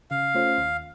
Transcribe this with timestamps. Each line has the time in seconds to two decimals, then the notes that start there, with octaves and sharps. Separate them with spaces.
0.11 C#3 F5
0.35 A3 C#4 F4 C5
0.58 D#2